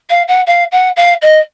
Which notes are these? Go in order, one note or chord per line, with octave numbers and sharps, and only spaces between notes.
F5
F#5
F5
F#5
F5
D#5